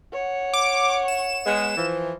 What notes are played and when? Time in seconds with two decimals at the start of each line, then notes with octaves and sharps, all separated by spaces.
0.13 C#5 F#5
0.53 D6
1.08 E7
1.45 G#3 B3
1.77 E3 F3